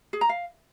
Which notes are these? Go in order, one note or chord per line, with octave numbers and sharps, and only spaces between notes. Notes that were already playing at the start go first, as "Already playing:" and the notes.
G#4
A#5
F5